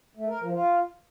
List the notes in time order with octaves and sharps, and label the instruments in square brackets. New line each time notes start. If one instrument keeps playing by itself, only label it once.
[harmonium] A3
A#4
F3
F4